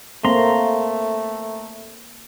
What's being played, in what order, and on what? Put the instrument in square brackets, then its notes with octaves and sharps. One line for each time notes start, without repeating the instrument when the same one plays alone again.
[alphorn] A3 [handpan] A#3 C4 [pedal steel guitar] A#5 C6